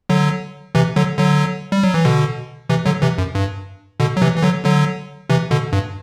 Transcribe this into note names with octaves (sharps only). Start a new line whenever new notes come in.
D3 F#3
C3 E3
D3 F#3
D3 F#3
G3
F#3
E3
B2 D3
C3 E3
D3 F#3
C3 E3
F#2
G2
B2 D3
F#3
C3 E3
E3
D3 F#3
D3 F#3
C3 E3
B2 D3
G2